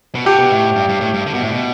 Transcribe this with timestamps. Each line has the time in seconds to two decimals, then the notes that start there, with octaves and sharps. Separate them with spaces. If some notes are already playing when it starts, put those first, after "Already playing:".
0.15 B2
0.26 D3 G4
0.39 B2
0.51 A2
0.76 G2
0.89 G2
1.01 A2
1.14 G2
1.26 D3
1.34 B2
1.42 A2
1.51 B2